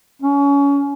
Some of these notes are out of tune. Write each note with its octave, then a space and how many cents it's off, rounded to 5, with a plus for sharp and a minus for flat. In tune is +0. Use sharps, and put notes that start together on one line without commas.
C#4 +25